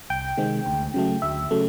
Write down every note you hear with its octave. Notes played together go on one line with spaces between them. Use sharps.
C2 G5
C3 D#3 G#3 C4
D2
C#3 F#3 A3
D2 E5
C#3 F#3 A3